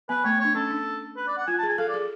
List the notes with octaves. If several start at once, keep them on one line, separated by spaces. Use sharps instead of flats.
B3 B4
A3 C#5
C#5
D4
C#4 A4
D4
B4
D5
F#5
F4 G#5
A5
G#4 G#5
A4 F5
D5
G#4